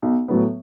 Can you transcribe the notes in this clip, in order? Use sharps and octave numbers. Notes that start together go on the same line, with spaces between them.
B1
A2 F#3 B3